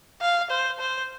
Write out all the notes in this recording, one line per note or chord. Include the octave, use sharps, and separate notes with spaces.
F5
C5
C5